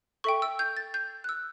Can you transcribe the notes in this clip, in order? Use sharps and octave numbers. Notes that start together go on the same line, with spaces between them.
A4 E5 G5 C#6
E6
G6
A6
G6
F#6
E6